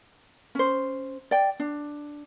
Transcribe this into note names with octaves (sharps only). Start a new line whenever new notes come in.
C#4 C5
D5 G5
D4